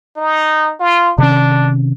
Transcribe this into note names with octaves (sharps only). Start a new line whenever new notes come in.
D#4
F4
C3 D#3 C#4 D4